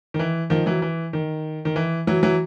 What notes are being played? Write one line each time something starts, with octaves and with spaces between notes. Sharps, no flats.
D#3
E3
D#3 F3
E3 F#3
E3
D#3
D#3
E3
E3 F#3
E3 F#3